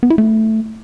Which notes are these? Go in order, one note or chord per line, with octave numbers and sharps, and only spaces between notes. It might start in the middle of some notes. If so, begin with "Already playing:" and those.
B3
E4
A3